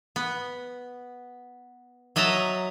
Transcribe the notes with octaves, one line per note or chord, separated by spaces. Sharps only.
B3
F#3 D#5 E5 A5 A#5